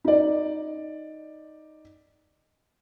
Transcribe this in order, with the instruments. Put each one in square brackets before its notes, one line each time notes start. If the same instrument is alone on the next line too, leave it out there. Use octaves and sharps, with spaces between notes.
[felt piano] D#4 D5